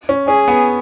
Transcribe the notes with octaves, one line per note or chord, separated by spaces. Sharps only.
C#4
C#4 G#4
B3